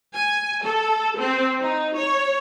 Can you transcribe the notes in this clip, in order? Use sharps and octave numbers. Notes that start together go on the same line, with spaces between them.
G#5
A4
C4
D#4
C#5